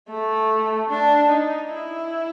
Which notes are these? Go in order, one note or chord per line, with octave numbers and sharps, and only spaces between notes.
A3
D4
D#4
E4